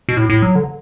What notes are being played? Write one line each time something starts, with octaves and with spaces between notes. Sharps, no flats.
B2
A2
A2
F#3
D3